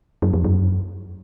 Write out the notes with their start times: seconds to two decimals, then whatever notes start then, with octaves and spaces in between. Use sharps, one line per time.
0.22 F#2
0.33 F2
0.44 F#2